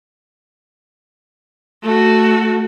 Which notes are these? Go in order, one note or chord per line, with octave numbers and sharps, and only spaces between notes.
A3 F#4